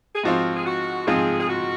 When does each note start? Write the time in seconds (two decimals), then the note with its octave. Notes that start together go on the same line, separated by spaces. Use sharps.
0.15 G#4
0.23 G#2 F3 C4 F4 F#4
0.56 G#4
0.66 F#4
1.07 G#2 F3 C4 F4 G#4
1.40 G#4
1.49 F#4